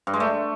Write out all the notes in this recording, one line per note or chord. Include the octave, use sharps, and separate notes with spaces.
G2
G#3
A3